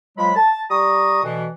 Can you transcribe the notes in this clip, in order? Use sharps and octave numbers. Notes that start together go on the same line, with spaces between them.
F3 F#3 G#3 B5
A5
G3 A#5 C#6 D#6
D2 B2 E3